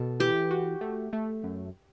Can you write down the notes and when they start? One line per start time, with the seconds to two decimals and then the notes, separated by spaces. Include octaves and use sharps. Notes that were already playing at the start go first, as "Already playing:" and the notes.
Already playing: B2 A4
0.20 E3 G4
0.51 F#4
0.81 A3
1.13 A3
1.43 F#2